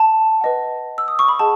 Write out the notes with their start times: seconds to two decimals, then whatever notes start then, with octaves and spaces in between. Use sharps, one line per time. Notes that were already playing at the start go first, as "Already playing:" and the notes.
Already playing: A5
0.41 B4 D#5 F#5
0.98 E6
1.08 D#6
1.19 C#6
1.28 B5
1.39 G#4 D#5 F#5 A5